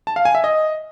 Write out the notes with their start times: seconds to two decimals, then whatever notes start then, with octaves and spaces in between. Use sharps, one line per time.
0.07 A5
0.16 F5
0.25 G#5
0.35 E5
0.44 D#5